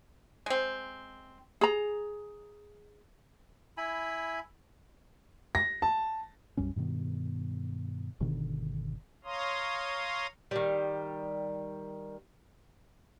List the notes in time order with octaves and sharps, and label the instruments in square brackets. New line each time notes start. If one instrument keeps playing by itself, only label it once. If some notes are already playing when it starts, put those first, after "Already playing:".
[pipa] G#3 C4
[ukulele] G#4 A#5
[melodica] E4 G#5 B5
[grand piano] A#6
A5
[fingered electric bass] B1 F#2 G3 C#4
G2 B2 D#3 B3
G1 B2 D3 D#3
[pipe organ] C#5 F5 A#5 C6 D#6
[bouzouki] D#3 G3